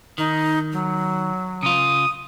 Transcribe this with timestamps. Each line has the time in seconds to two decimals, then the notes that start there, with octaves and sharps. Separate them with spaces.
0.18 D#3 D#4
0.72 F#3
1.63 C#3 F4 D#6